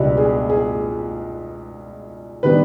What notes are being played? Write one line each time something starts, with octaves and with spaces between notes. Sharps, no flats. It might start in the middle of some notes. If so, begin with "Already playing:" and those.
Already playing: C#2 B2 G3 B3 D4 G4
G#4
G#4
D#3 G3 B3 D4 B4